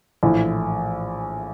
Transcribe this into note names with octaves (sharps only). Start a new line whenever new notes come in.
A#1 A2 E3